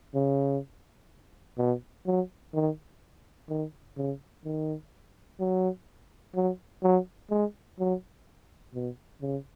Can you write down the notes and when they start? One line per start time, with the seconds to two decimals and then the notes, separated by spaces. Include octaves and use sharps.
0.15 C#3
1.58 B2
2.06 F#3
2.54 D#3
3.49 D#3
3.97 C#3
4.45 D#3
5.40 F#3
6.35 F#3
6.83 F#3
7.30 G#3
7.79 F#3
8.74 B2
9.22 C#3